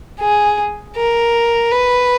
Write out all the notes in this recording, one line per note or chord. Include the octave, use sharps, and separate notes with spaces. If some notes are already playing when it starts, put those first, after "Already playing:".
G#4
A#4
B4